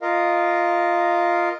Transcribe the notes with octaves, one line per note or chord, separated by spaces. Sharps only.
F4 A#4 D#5 F5